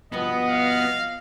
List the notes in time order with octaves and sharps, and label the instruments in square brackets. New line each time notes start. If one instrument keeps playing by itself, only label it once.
[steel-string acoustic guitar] G2 B2 F3 [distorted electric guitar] B3 [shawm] D#5
[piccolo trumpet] F5